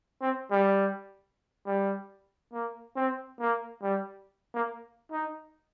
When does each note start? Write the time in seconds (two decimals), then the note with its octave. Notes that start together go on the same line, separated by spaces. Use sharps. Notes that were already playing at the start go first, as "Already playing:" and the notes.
0.22 C4
0.51 G3
1.66 G3
2.53 A#3
2.96 C4
3.40 A#3
3.82 G3
4.54 A#3
5.12 D#4